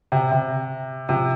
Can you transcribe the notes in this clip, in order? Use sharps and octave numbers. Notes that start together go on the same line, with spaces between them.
C3
C3
C3 F3